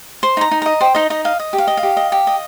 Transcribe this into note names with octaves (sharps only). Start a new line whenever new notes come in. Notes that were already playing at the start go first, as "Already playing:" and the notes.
C5 C6
D#4 A#5
D#4
D#5 A#5
C5 G5
D#4 D#5
D#4 D#5
D#5 F5
D#5
G4
F5
D#5
F5
G4
D#5
G4
D#5